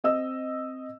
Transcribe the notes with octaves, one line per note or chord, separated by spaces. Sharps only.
C4 D#5 E6